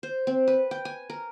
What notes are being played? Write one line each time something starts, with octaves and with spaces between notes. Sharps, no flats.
C5
C4
B4
G5
G#5
A#4